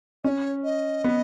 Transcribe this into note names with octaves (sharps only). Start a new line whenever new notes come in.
C#4 C#5 D#5
D#5
B3